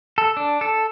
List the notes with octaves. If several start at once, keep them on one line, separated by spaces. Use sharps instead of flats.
A4
D4
A4